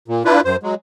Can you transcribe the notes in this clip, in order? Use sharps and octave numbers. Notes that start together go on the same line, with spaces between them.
A#2
D4 E4 F4 B4
F#2 C5
F#3 G#3